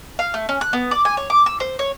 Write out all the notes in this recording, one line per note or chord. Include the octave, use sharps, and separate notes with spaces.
F5
A3
C#4
F#6
B3
D5
G#5
C#5
D6
E6
C5
C#5